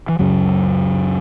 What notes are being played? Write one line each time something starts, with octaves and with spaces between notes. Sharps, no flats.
E3
C#2 F#2 C#3 F#3